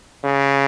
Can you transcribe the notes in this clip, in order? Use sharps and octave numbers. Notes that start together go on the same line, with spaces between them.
C#3